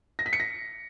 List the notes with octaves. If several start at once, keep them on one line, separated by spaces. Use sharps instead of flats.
A#6
B6
C#7
A#6